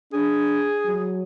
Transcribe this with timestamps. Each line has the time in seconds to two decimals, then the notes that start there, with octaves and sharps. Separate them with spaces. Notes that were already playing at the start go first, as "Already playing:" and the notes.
0.13 D4 G#4
0.86 F#3